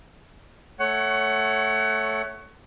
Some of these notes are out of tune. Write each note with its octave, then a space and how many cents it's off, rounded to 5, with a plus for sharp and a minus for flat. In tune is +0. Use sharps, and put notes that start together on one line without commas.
A3 +0 C#5 +0 F#5 +25